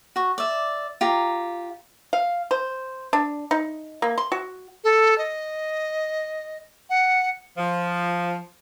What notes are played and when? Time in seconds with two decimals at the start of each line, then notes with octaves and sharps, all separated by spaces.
0.16 F#4 C#6
0.38 D5 E5
1.01 F4 G4 A#5
2.13 F5
2.51 C5
3.13 D4
3.51 D#4
4.02 A#3
4.18 C6
4.32 F#4
4.84 A4
5.18 D#5
6.90 F#5
7.58 F3